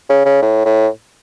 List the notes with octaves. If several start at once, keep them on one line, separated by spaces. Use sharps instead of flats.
C#3
C#3
A2
A2